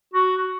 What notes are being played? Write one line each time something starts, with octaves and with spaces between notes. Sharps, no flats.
F#4